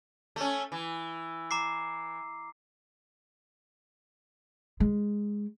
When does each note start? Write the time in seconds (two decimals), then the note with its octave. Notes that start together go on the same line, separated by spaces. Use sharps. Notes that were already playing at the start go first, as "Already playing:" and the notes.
0.36 A3 C#4
0.72 E3
1.51 A#5 D6 C7
4.80 G#3